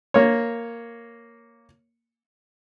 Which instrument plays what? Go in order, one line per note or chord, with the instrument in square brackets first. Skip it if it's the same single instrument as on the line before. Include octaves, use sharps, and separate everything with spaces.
[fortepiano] A#3 C#5